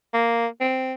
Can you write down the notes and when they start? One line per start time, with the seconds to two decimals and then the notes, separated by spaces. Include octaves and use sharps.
0.14 A#3
0.60 C4